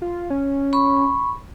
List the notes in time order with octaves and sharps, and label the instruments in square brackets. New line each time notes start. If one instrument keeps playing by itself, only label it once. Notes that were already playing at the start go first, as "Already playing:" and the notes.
[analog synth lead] F4
C#4
[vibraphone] B5 C#6